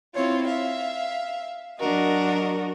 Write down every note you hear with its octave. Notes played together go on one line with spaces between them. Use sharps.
C4 E4 F4 C#5
E5 F5
F#3 D4 F#4 A#4 D#5